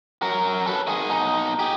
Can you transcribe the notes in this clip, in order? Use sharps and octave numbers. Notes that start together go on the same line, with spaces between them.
F#3 A#4
A4 B4
D#3 G#4
B2 D#4
G4 G#4